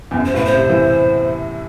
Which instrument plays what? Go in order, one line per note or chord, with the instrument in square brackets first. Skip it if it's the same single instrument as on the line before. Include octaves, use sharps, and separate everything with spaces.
[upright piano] E2
F#2
[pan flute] C5
[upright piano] A2 [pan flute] B4
[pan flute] C5
[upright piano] C3
E3